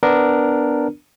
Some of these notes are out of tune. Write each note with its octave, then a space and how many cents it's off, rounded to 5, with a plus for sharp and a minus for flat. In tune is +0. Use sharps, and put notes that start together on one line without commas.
B3 +10 D4 +0 A#4 +0